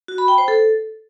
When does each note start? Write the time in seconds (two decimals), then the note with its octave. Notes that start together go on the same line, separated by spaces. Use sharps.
0.08 F#4
0.18 B5
0.28 G5
0.38 C5
0.48 A4